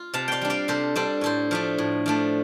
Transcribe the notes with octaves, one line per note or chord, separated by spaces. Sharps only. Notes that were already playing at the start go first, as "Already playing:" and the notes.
Already playing: F4
C3 F5 A5
D5 F5 G5
G3 D4
D5 F5
C3 A4 C5
G3 D4 A4 C5
A2 A4 C5
F3 A3 D4
A2
F3 A3 D4